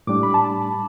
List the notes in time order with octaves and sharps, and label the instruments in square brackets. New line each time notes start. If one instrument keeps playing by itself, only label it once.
[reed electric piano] A2 G3 D4 [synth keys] D6
[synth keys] B5
A5